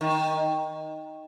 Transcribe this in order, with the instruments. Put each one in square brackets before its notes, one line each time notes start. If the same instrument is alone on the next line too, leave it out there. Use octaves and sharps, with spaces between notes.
[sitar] D#3